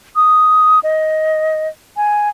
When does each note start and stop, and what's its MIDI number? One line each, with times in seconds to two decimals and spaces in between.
0.16 0.80 87
0.83 1.68 75
1.97 2.29 80